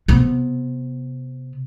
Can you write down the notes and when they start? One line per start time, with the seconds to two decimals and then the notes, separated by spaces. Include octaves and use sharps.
0.08 C3 B3